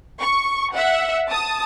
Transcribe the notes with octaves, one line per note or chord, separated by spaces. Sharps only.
C#6
E5 F#5
A5 D#6